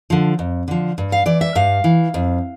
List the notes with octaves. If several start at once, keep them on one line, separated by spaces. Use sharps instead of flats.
D3 F3
F2
D3 F3
G2
F5
E3 D5
E5
G2 F5
E3
F2